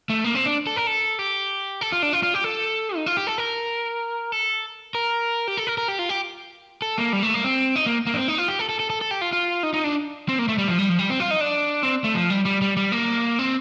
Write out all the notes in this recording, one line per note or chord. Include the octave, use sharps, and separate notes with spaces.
A3
A#3
C4
D4
A4
A#4
A4
G4
A4
F4
D4
F4
F4
G4
A4
D#4
F4
G4
A4
A#4
A4
A#4
G4
A4
A#4
A#4
G4
F4
G4
A4
A#3
G3
A3
A#3
C4
D#4
A#3
A#3
D4
C4
D#4
F4
G4
A4
A4
A4
A4
A4
G4
F4
F4
D#4
D#4
D4
C4
A#3
A3
G3
F3
G3
F3
G3
C4
F4
D#4
D4
C4
A3
F3
G3
G3
G3
G3
A#3
C4